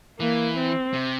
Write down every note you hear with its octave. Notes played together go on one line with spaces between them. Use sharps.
E3 A#3
C4
C3